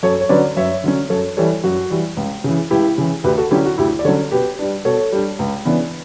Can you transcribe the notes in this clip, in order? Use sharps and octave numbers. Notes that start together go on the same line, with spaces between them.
F#2 A4 C#5
C#5
D3 F#3 C#4 B4 D5
F#2 C#5 E5
D3 F#3 C#4
F#2 A4 C#5
E3 G3 A4 C#5
F#2 F#4
E3 G3
C#2
C#3 E3
C#2 E4 G4
C#3 E3
D2 G4 B4
F#4 A4
D3 F#3 C#4 E4 G4
F#4
D2 E4 G4
D5
D3 F#3 C#4 A4 C#5
B2 G4 B4
G3 D4
B2 A4 C#5
G3 D4
C#2
C#3 E3 B3 D4